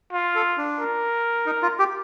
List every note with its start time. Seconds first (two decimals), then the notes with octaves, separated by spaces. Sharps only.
0.13 F4
0.35 A4
0.57 D4
0.80 A#4
1.46 D#4
1.63 F4
1.79 G4